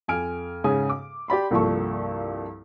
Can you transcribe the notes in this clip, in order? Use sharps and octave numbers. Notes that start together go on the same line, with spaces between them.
F2 G#5 F6 D7
G#2 C#3 G#5 D#6
D6
G4 D5 B5 C6
C2 G2 F3 A#3 A4 C#6